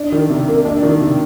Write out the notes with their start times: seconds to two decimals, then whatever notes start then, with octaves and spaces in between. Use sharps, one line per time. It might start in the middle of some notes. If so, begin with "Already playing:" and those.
Already playing: D4
0.12 D#3
0.30 C3
0.48 A#3
0.65 D4
0.83 D#3
1.01 C3